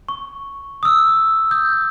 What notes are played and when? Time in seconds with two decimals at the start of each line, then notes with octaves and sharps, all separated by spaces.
0.09 C#6
0.83 D#6 E6
1.51 D#6 G6